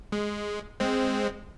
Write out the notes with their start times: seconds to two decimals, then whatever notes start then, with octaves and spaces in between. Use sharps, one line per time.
0.12 G#3
0.80 G#3 C4